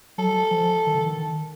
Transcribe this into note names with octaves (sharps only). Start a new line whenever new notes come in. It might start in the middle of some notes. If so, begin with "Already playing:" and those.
F#3 A4
F3
D#3
D3
D#3